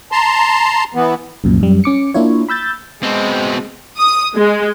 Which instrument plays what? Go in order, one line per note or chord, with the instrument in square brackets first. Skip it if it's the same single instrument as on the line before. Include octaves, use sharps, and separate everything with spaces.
[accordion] A5 A#5 C6
E3 B3
[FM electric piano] C2 F#2 A#2
F#2 G3
C#4 D6 C#7
A#3 D4 E4 F4 C#5
B5 E6 G6 A6
[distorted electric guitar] B2 C4 [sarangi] G#3
[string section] D#6
G#3